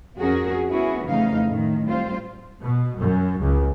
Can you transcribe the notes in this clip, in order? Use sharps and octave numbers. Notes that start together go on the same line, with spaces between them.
F2 C#4 F#4 G#4 A#4
B3 C#4 E4 F#4 G#4
F2 C#3 E3 A3 D#4 F5
A2 D#3
G3 C4 F4 C5
B2
F#2
C#2